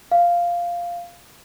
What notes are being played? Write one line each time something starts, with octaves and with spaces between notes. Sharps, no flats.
F5